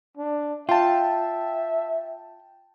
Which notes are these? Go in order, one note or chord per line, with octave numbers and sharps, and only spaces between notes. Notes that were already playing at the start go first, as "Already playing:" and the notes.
D4
F4 E5 G5 A5